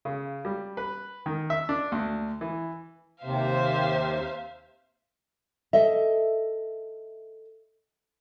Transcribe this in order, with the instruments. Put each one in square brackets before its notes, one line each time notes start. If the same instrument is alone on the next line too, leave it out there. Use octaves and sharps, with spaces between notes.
[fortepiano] C#3
G3
B4
D#3
E5
D4
D2
E3
[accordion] D#2 C3 [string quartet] C5 E5 F5
[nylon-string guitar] A4 D#5 E5